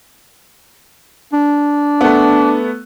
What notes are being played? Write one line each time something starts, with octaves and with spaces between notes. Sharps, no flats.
D4
A3 B3